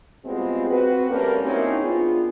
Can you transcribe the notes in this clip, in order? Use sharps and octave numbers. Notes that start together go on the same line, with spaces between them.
G3 G#3 B3 C4 F4 F#4
C4 F#4 B4
G3 A3 A#3 C#4 A#4
A#3 C4 C#4 D#4 E4 F#4
F#2 B3 D4 F4 G#4